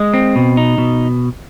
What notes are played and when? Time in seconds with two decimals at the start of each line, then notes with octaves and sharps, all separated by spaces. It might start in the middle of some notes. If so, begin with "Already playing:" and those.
Already playing: G#3 D#5
0.14 C4
0.36 B2
0.57 D#4
0.78 B2